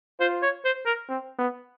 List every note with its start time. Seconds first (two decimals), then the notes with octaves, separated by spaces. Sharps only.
0.20 F4 C5
0.43 C#5
0.65 C5
0.86 A#4
1.09 C4
1.39 B3